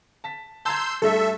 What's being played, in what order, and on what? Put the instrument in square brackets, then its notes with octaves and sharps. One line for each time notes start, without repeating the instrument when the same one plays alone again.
[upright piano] A5 B6
[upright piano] A5 A#5 G#6 [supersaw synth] C6 E6 G6
[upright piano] G2 A3 B6 [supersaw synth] A4 E5